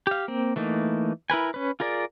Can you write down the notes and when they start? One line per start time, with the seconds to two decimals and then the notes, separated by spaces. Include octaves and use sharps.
0.07 G4 F5
0.28 A#3 C4
0.56 E3 A3 A#3 D#4
1.30 E4 A#4 B4 G#5
1.54 C#4 B4
1.80 F4 G#4 A#4 D5